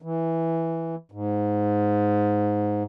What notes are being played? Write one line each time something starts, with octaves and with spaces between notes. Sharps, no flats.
E3
G#2